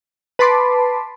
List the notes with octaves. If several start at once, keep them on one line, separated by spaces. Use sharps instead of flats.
B4 A5 B5 C6 D6